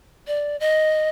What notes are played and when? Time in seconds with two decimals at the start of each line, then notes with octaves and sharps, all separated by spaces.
0.27 D5
0.60 D#5